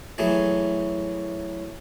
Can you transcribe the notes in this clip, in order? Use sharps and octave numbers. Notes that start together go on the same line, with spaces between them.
E3 F#3 A3 G#4